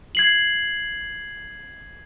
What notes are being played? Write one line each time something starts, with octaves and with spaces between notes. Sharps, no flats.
G#6 C7 F#7